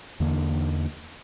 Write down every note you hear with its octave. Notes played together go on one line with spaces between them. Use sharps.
E2 D3 A#3 D4